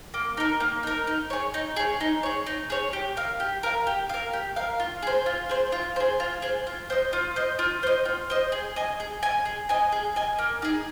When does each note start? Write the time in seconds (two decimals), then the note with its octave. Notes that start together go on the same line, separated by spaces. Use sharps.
0.14 A#3
0.37 D#4 A#4
0.60 A#3
0.83 D#4 A#4
1.07 D#4
1.30 G#4 C#5
1.54 D#4
1.76 G#4 C#5
2.01 D#4
2.23 G#4 C#5
2.46 D#4
2.70 G#4 C#5
2.93 G4
3.17 A#4 F5
3.40 G4
3.63 A#4 F5
3.87 G4
4.09 A#4 F5
4.33 G4
4.56 A#4 F5
4.80 F4
5.03 G#4 C5
5.26 F4
5.49 G#4 C5
5.72 F4
5.96 G#4 C5
6.20 F4
6.42 G#4 C5
6.67 F4
6.90 C5 D#5
7.13 F4
7.36 C5 D#5
7.59 F4
7.83 C5 D#5
8.06 F4
8.30 C5 D#5
8.52 G#4
8.76 D#5 G#5
9.00 G#4
9.23 D#5 G#5
9.45 G#4
9.69 D#5 G#5
9.92 G#4
10.16 D#5 G#5
10.39 A#3
10.62 D#4 G#4